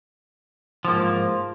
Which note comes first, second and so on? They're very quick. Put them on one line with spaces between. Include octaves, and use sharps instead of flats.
F3 A#3 G#2